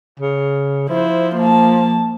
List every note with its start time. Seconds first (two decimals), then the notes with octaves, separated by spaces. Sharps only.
0.20 C#3
0.89 F3 E4 C5
1.36 A#3 A5